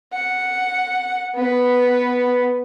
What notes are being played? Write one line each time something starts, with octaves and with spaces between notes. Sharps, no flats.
F#5
B3 B4